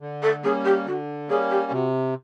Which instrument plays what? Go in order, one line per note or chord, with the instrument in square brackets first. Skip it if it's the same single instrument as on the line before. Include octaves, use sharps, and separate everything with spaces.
[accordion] D3
[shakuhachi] A4
[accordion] G3 A#3 C#4 [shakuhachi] G#4
[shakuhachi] G4
[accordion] D3 [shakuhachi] F#4
[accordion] G3 A#3 C#4 [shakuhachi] G#4
[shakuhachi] G4
[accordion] C3 [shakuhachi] F#4